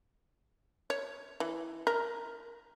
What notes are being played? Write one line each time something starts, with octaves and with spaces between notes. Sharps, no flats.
C#5
E3
A#4